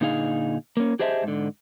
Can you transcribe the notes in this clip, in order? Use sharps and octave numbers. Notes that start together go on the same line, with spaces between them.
A#2 D3 D#4 G#4 F5
A#3 C#4
G4 G#4 C5 D#5 E5 A5
G#2 D3